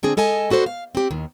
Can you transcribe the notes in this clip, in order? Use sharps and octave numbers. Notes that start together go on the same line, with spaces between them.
D3 C4 D4 G#4
G#3 A4 D#5 G#5 A5
B3 F#4 A4 C5 D5
F5
C4 G4
D#2 D#3